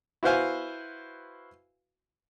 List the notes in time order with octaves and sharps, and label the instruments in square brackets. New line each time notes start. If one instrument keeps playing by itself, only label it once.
[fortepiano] E4 F#4 B4 C5 F5 G#5